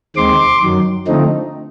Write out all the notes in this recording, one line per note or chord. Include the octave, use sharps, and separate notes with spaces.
D#2 D#3 G#3 C4 C6 D6
F#2 D#3 F#3
D3 F3 A3 C4 D#4